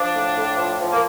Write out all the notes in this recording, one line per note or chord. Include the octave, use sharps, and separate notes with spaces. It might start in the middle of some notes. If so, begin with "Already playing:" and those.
Already playing: F3 D4
A2
A2
F3
F3
A#3